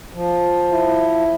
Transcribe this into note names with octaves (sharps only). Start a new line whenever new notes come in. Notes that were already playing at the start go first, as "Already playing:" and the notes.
F3
E4